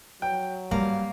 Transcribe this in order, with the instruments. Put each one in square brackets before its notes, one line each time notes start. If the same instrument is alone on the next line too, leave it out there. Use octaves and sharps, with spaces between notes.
[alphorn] F#3 [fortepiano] G5
[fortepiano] G2 [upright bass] G3 [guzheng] A#3